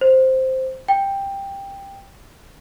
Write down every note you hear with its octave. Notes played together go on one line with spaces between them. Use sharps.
C5
G5